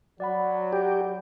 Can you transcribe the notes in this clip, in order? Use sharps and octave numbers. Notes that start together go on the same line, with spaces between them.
F#3 D5 F#5 B5
G4